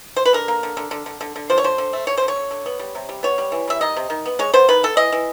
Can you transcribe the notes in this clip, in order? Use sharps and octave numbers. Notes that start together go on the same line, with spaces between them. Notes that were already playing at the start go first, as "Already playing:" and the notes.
C5
B4
D3 A#4
A#3
D3
D3
D3
D3
D3
D3
F3 C5
C#5
F3 C5
D3
A3
D3 C#5
D3 C5
C#5
D3
D3
B3
G3
C3
G3
B3 C#5
G3
E3
G3 E5
D#3 D#5
C3
D#3
B3
G#3 C#5
B3 C5
D#3 B4
B3 A4
E3 D#5
E3